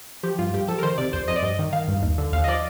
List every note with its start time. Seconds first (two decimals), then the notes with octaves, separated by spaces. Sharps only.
0.23 F3 G4
0.38 G2 F4
0.54 G2 G4
0.68 F3 A4
0.79 A#4
0.83 D#3 C5
0.98 C3 D5
1.13 F2 C5
1.28 F2 D#5
1.36 D5
1.43 G2 D#5
1.59 D#3
1.73 D#3 F5
1.88 G2
2.03 D#2
2.18 D3
2.32 D#2 F5
2.44 D#5
2.48 F3 D5